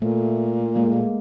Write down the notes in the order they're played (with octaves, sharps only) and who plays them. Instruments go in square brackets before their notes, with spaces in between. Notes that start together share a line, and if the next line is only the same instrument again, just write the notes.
[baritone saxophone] A#2 [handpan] A3
[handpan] G#3 A#3